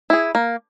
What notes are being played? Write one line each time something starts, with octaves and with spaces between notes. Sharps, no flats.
E4 G#4
A#3